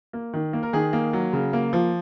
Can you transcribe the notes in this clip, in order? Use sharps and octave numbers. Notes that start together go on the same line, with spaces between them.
A#3
D#3
A#3
A#4
D#3 G#4
A#3
F#3
C#3
A#3
F3